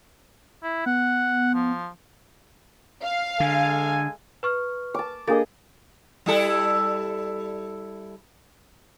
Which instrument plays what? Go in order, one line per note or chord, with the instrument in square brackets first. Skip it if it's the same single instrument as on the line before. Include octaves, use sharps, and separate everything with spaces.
[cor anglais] E4
[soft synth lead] B3 [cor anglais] F#5
[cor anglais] F3
[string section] F5
[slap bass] D3 [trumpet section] G#3 A4 G#5
[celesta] B4 C#6 F6
[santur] A5 D6
[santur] A#3 G#4 D#5 [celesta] D4 A4 A6
[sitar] G3 E4 A4